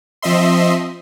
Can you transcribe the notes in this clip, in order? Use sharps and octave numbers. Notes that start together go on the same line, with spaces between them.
F3 C4 D#5 E5 C6